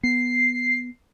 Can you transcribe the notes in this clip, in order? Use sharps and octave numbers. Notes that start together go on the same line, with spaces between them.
B3 C7